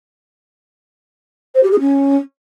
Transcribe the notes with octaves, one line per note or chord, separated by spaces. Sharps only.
C5
G4
G#4
C#4